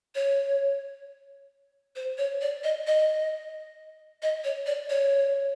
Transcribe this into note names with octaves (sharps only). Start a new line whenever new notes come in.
C#5
C5
C#5
D5
D#5
D#5
D#5
C#5
D5
C#5